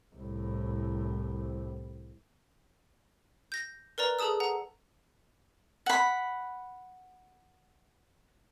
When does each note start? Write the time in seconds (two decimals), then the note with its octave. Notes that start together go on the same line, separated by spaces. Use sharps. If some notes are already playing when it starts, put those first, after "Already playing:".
0.15 C2 A2
3.52 G6 A#6
3.98 A#4 B4 D5 A#5
4.19 G#4 A4 A5 D#6 E6
4.40 F#5 A#5
5.86 F#5 B5